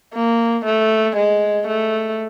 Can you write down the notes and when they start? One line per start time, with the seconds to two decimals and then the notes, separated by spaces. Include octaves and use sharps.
0.14 A#3
0.66 A3
1.16 G#3
1.68 A3